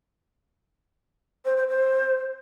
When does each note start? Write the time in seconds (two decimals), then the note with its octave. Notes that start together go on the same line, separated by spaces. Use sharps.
1.45 C5
1.57 C5
1.68 C5